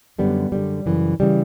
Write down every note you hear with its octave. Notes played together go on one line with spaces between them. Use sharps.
F#2 D3 G3 B3
F#2 D3 G3
F#2 C#3 E3
C#3 E3 G3